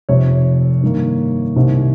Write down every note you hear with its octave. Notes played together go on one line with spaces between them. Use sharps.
F1 F2 C3 C#5
G2 D#3 A#3
C2 C3 D#3